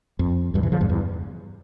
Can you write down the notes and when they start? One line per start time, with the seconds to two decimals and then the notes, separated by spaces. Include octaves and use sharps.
0.19 F2
0.54 E2 G2
0.63 C3 E3
0.72 C#3 F3
0.81 F2 G#2
0.89 E2 G2